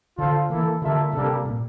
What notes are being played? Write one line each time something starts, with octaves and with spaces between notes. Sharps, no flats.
D3 F4 A4 C5 F5
E3 A#3 E4 A4
D3 G3 A#3 F4 A4 E5
C3 G3 A#3 D4 A4
A#2